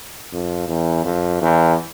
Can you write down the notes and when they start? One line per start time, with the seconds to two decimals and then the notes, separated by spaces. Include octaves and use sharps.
0.33 F2
0.68 E2
1.05 F2
1.42 E2